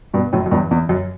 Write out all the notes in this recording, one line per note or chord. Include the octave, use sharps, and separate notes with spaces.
G2 B2
F#2 A2
F#2
E2 G2
E2
F#2